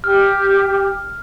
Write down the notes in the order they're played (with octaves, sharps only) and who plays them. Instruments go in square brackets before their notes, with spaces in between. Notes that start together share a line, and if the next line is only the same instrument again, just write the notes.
[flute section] G4 [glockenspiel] F6